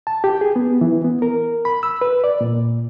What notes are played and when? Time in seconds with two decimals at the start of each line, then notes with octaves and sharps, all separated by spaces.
0.07 A5
0.24 G4
0.41 G#4
0.56 B3
0.81 E3
1.04 B3
1.22 A#4
1.65 B5
1.83 E6
2.01 B4
2.24 D5
2.41 A#2